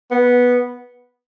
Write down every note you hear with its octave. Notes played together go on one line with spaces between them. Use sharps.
B3